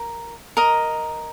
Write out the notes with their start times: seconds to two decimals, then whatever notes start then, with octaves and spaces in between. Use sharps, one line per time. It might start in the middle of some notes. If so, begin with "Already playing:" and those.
Already playing: A#4
0.57 A#4 D#5 A#5